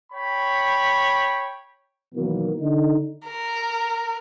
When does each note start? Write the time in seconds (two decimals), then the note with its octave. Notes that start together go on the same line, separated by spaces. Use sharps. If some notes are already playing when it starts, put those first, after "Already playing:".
0.12 C#5 G5 B5
2.15 B2 D#3 E3 F#3 A#3 B3
2.59 D3 D#4
3.25 A#4